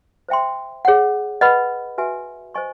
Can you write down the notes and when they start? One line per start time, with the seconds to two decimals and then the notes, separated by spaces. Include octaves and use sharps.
0.29 C5 E5 G5 C6
0.85 G#4 C#5 F#5
1.41 B4 D#5 F#5 B5
1.98 F#4 B4 E5 G#5
2.54 C5 D#5 G#5 C#6